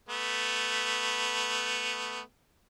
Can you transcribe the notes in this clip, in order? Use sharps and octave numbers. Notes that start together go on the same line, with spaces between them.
A3 B3